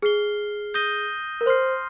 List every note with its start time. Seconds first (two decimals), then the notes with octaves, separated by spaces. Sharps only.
0.02 G#4 F6 C7 G7
0.74 D#6 G6 A#6 D#7 G7
1.41 A#4
1.46 C5 C6 F6 C7